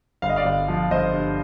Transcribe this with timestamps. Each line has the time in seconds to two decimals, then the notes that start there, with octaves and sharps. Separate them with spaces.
0.22 G1 F5
0.29 D#5
0.36 D5 F5
0.45 G1
0.68 F3
0.91 G1 C5 D#5
1.14 G2